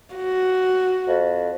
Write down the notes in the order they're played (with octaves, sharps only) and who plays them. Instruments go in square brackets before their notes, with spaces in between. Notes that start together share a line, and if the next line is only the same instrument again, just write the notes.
[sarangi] F#4
[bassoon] F2